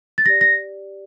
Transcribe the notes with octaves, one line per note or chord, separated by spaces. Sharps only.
A6
G4 D5 A#6
A#6